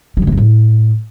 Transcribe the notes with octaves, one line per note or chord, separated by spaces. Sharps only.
F#3
D3
A3
G2
A2